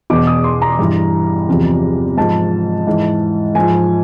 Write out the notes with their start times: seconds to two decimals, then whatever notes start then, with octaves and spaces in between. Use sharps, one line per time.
0.10 E2 B2 D6
0.27 D#6
0.44 C6
0.62 A#5
0.79 G2 E3
1.49 E2 C3 F3
2.17 G#2 F3 A5
2.87 G#2 E3
3.55 G#2 F3 G#5